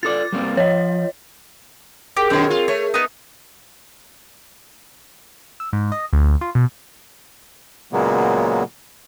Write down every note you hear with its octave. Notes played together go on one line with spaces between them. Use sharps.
F4 A4 D5 D6 A6
G3 A#3 C4
F3 C#5 D#5
G4 G#4 A#4
F#2 B2 D#3 C4 C#5
F4
A3 C#5
B3 D#4
E6
G#2
D#5
D2
F4
B2
A#2 C#3 F#3 G#3 A#3 B3